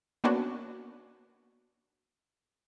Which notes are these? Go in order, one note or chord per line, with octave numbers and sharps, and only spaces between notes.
A#3 B3 C#4 D4 F#4